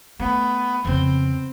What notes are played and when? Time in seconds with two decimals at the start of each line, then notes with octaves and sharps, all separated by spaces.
0.19 A3 B3
0.85 F2 C#3 C4